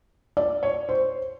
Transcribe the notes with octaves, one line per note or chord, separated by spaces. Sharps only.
D5
C#5
C5